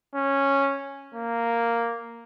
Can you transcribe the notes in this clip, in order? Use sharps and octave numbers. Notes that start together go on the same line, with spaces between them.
C#4
A#3